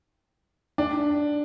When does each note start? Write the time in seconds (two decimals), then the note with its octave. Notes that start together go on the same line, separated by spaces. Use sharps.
0.78 D4